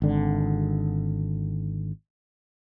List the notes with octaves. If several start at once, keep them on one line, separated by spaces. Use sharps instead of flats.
G#1 D3